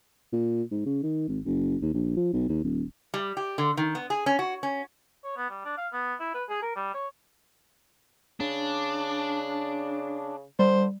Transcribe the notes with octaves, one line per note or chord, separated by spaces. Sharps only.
A#2
G#2
C#3
D#3
G#1
F#1
D#2
A#1
F3
B1
D#2
D#1
G3
G4
D3
D#3
B3
G#4
C#4
F#4
C#4
C#5
B3
G3
D4
F5
B3
E4
B4
G#4
A#4
G3
C#5
C#3 D4
D3 G3 C5